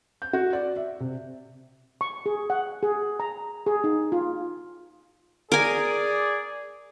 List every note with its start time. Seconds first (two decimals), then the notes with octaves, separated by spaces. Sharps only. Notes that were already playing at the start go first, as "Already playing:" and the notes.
0.22 G6
0.33 F#4
0.53 D5
0.76 E5
1.00 C3
2.01 C#6
2.26 G#4
2.50 F#5
2.83 G#4
3.20 A#5
3.66 G#4
3.84 D#4
4.12 F4
5.52 G#4 A#4 D5 G#5